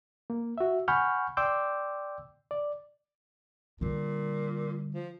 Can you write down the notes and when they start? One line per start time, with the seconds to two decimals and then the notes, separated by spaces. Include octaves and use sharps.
0.30 A#3
0.58 F#4 E5
0.88 F#5 G#5 B5 C#6 F6 G6
1.37 D5 G5 C6 D6 E6 G6
2.51 D5
3.81 A#2 D3 G3
4.94 F3